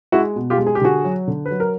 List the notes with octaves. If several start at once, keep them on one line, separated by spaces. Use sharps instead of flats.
G#3 E4 F#4
B2
F4 G4
G#3
G#4
G4
D3 F#4 G#4
F#3
D3
F#3 B4
A#4